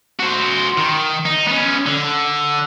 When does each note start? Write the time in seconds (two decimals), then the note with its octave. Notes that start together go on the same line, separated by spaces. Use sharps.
0.20 F#4 C5
0.78 D#3
1.26 D#4
1.48 B3 C#4
1.86 D3